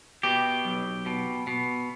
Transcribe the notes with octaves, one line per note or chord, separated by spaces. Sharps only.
B2 G4
B1
B2
B2